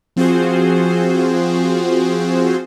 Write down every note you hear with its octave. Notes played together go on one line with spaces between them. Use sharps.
F3 C4 F4 F#4 G#4 C5